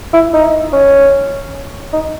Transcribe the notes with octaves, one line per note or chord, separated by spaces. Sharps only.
E4
D#4
C#4
D#4